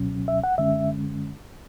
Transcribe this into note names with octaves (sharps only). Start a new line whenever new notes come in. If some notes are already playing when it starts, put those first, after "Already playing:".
Already playing: C#2 B2 F#3 C#4
E5
F#5
F#2 D3 G#3 C#4 E5